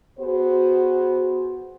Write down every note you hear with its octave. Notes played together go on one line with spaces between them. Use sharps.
B3 F#4 G#4 C5